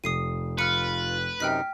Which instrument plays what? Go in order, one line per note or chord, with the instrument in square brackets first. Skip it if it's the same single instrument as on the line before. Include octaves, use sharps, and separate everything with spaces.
[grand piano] F1 [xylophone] D#6 C7 D#7
[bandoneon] F4 [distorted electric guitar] B4 [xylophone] F6 C#7
[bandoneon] F#2 C3 D#4 [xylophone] G5 F6 B6